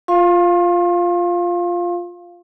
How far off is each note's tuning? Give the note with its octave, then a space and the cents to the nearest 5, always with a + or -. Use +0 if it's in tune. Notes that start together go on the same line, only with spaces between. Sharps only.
F4 +0 F5 +0 C6 +40